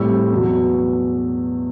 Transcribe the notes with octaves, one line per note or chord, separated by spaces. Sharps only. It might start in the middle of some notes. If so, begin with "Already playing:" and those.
Already playing: A2 G3 C4 E4 E6
E2 B2 F#3